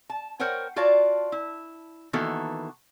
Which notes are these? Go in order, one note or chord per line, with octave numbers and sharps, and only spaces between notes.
A5
A#4 C5 C#5 F#5 G5
F4 F#4 C#5 D5 F5 A5
E4
D#3 E3 A#3 B3 F#4 A4